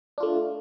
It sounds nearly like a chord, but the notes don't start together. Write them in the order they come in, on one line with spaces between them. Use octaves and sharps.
D4 F4 A3